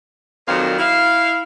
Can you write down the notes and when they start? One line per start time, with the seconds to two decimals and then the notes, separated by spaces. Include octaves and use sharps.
0.48 F2 A#2 D#3 F#3 F5
0.79 E4 F5